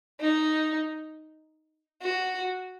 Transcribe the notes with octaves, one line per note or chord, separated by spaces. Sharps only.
D#4
F#4